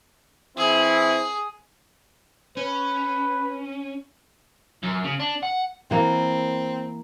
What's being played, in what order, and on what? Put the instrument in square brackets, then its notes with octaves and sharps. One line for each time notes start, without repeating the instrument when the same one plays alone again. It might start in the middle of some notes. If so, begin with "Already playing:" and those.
[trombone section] E3 C4 E4 [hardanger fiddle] G#4
[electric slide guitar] C#4 [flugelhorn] B4
[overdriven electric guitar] F#2
C#3
D4
F#5
[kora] E3 A#3 [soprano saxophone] C4